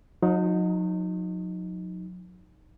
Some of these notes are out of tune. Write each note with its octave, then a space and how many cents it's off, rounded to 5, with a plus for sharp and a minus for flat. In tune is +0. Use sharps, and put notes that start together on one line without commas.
F#3 -40 D#4 +0